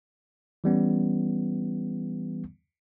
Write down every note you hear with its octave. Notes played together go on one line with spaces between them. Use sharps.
E3 G3 B3 C#4